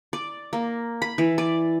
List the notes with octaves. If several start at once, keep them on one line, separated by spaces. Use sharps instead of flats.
D5
A#3
B5
E3
D5